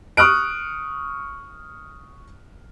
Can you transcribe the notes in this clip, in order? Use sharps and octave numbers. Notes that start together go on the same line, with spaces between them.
C#6 D#6 F6 F#6 D7